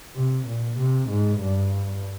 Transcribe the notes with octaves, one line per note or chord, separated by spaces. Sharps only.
C3
A#2
C3
G#2
G2